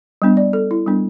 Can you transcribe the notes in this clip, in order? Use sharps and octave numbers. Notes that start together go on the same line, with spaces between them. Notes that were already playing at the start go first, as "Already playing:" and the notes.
G3 B3 D4
D5
A4
E4
G3 B3 D4